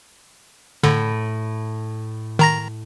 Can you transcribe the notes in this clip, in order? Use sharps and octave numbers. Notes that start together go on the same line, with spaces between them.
A2 D3
D#3 A#5 A#6